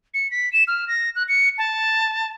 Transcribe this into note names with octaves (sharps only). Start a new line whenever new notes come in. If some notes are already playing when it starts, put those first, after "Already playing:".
C#7
B6
E7
F6
A#6
F#6
C#7
A5